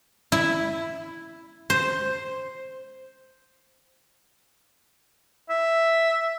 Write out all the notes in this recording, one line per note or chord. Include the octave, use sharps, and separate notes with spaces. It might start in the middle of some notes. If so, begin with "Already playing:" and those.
E4
C5
E5